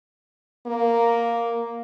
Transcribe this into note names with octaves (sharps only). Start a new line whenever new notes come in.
A#3